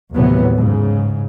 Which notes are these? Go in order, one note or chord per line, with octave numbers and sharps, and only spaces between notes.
D#2 A2 C3 E3 F#3 B3
G#2 C#3